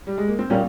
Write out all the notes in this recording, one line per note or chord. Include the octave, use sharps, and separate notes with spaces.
G3
G#3
A#3
C4
A#2 G3 A#3 C#4